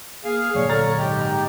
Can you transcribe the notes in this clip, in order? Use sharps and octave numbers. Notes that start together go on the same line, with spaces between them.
A#3 G#4 F5
A#2 D3 F#3 C#5 D5
A4 A#5 F6 A6
G#2 G4 D#5
A#5